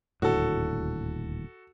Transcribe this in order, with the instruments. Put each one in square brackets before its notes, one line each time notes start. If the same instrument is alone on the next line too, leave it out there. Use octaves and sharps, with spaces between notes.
[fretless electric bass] D#1 D2 A2 [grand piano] F#4 A4